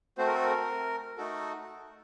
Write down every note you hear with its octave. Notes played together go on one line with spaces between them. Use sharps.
A3 C4 F#4 C5
A#4
A4
A#4
A3 D#4 F#4 A4